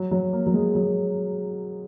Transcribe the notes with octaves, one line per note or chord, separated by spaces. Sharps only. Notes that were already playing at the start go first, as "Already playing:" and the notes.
Already playing: F#3
F#3
A#3
F#3
G#3
F#3